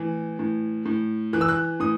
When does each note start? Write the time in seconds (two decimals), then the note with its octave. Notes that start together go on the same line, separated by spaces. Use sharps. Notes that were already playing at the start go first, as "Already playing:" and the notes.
Already playing: A2 E3
0.39 A2
0.86 A2
1.33 E3 F#6
1.41 E6
1.49 F#6
1.80 A2 D#6